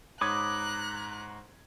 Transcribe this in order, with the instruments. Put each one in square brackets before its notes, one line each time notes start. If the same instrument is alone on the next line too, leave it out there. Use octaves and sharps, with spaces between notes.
[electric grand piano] G#2 C#5 G#6 [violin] A#5 F#6 [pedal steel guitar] B5 D6 D#6